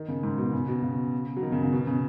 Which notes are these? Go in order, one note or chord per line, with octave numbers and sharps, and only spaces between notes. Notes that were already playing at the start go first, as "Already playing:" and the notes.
Already playing: D#3
C#3
G#2
B2
C#3
B2
C#3
F#3
D#3
C#3
C#3
B2
C#3